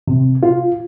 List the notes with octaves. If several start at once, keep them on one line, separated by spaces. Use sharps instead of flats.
C3
F4